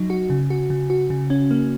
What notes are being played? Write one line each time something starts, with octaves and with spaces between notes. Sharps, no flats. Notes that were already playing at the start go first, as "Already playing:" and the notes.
Already playing: F#3 D#4
F#4
C#3
F#4
C#3
F#4
C#3
C#4
A#3